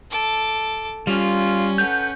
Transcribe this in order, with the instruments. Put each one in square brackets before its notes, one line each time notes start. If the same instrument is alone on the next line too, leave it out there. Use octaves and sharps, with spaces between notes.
[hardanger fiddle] A4 D6
[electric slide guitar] G3 [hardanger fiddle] C#4 [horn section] F4
[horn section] A4 B4 F#5 [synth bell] G6